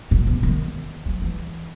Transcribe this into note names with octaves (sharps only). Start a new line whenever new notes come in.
A#2
B2
D#3
F#3
E3